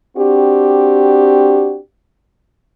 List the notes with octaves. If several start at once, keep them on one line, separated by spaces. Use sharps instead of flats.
C4 D4 F#4 G4